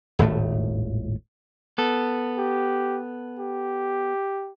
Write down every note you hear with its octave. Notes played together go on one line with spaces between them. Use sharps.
D#1 G#1 A2 A3
B3 A4
G4
G4